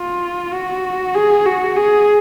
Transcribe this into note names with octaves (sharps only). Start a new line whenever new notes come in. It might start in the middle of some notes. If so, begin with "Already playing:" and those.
Already playing: F4
F#4
G#4
F#4
G#4